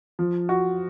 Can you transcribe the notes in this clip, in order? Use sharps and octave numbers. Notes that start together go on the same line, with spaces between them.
F3
F#4